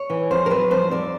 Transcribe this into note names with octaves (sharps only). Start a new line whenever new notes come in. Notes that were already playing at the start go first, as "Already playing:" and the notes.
Already playing: C#5
E3
F2 C5
A#4
F#3 B4
F2 C5
F2 D5